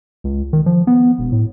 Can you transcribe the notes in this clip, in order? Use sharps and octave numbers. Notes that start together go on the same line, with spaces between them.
C#2
D#3
F3
B3
E1
A2